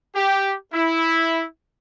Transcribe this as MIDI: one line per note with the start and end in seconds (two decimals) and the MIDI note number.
0.16 0.55 67
0.74 1.44 64